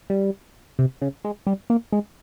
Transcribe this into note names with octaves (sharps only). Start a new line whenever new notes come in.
G3
C3
C#3
G#3
G3
A#3
G#3